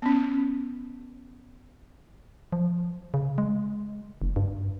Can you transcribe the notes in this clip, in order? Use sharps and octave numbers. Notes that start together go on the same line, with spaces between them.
B3 C#4
F3
C#3
G#3
F#1
G2